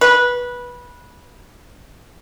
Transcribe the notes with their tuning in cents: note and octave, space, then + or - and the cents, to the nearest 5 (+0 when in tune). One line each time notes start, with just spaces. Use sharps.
B4 -15